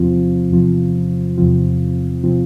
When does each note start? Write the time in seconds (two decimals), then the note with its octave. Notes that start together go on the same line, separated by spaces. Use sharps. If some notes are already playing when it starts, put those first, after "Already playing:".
Already playing: E2 C3 F3 C4 F4
0.51 E2 C3 F3 C4 F4
1.38 E2 C3 F3 C4 F4
2.24 C3 F3 C4 F4